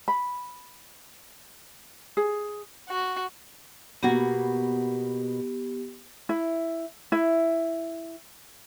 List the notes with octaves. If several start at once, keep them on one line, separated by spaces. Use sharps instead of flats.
B5
G#4
F#4
B2 A#3 B3 F#4 G4
E4
E4